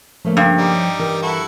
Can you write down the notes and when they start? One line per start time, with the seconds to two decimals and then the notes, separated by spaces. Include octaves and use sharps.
0.25 C#3 F3 A3 A#3
0.37 G2
0.58 G3 D#4
1.00 E3 A#4
1.22 E4 F#4 A4